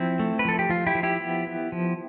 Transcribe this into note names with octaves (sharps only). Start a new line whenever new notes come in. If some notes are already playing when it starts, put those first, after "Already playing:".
Already playing: F3 C4 E4
A3
B4
F3 A4
G4
F3 F4
E4 G4
F3
E4 G4
B3
B3
F3